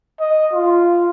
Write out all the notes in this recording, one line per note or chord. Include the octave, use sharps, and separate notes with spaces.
D#5
F4